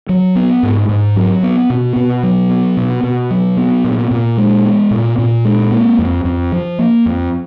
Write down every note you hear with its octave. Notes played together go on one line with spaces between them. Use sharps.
F#3
B3
G#2
G#2
F#3
B3
B2
B2
F#3
B3
B2
B2
F#3
B3
A#2
A#2
G#3
B3
A#2
A#2
G#3
A#3
F2
F2
F3
A#3
F2